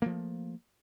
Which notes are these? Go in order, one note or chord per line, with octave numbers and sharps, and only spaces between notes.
F3 A3 A#3